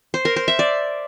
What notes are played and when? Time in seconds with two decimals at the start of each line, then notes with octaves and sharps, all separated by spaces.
0.14 C5
0.25 A#4
0.36 C5
0.48 E5
0.59 D5